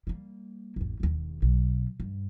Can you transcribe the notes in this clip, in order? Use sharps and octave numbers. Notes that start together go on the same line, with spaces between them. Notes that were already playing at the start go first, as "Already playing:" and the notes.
G3 A#3
G#1 E2
E1 D#2
B1
G2